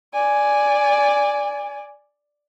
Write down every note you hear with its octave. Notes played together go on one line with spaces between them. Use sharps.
D5 G#5